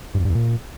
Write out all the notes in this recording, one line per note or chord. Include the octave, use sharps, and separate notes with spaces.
G2
F2
G2
E2
A#2